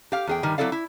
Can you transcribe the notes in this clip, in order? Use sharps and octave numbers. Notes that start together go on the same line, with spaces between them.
G4 F5
E2 G#4 G5
G2 D#3 G3
F#3 C4 E4 A4 D5 F5
E4